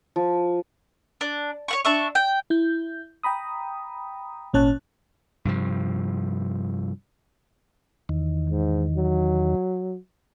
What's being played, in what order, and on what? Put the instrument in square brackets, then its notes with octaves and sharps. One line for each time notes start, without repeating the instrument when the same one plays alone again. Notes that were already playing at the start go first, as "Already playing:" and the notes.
[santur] F3
[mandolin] D4
C#5 F#5 C#6
D4 E5 C#6
G5
[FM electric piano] E4 G6
G5 A#5 B5 D#6
G#1 A#2 C#4 C#5 A5 F#6
[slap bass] G2 C3 F3
[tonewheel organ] E2 D#3
[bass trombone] G#2
F#3